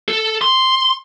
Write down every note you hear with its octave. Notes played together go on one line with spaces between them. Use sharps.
A4
C6